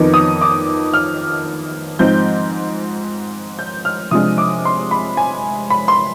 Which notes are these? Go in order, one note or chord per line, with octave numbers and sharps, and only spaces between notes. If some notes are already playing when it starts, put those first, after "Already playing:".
Already playing: F2 D#3 B3 D#4 D6
D#6
D6
F6
G#2 F3 C4 G6
G6
F6
C3 F3 G#3 D4 D#6
D6
C6
B5
G#5
B5
C6